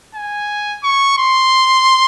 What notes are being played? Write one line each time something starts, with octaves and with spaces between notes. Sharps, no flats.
G#5
C#6
C6